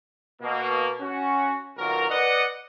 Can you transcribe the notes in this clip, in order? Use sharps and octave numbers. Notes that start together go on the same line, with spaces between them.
B2 A#3
C#4 F#4
B1 A#2 D#3 F#4 A#4
B4 D5 D#5 F#5